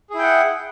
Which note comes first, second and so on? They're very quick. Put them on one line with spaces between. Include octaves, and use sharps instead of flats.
G#4 E4 G5 F#5